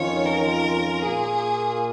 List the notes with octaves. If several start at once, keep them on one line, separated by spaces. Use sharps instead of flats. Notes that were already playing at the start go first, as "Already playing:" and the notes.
Already playing: F2 D#3 C#4 F4 C#5
A#4
A#2 A#3 F4 G#4